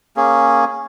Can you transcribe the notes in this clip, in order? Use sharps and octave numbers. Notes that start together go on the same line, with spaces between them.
A#3 C#4 G#4